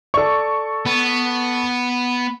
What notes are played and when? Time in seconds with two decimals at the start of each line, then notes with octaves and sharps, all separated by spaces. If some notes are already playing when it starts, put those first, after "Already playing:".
0.14 A4 D5 C#6
0.86 B3